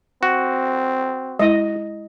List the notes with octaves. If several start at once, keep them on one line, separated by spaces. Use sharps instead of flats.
C4 F#4
G#3 E4 D#5